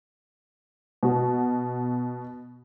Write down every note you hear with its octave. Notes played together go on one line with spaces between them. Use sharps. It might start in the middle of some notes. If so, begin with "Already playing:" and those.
B2 F#4